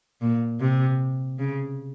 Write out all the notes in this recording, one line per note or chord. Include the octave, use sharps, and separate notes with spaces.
A#2
C3
C#3